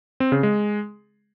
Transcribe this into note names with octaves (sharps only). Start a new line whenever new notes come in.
C4
C#3
G#3